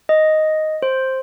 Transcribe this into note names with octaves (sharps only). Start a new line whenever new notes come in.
D#5
C5